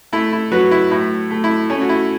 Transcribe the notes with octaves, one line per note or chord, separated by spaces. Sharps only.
A3 E4
E4
F#3 F#4 B4
E4
A2 E4
A3
E4
A3 C#4
F#4
E4